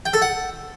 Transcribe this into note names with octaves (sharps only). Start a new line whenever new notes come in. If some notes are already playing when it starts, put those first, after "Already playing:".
G5
A4
F#5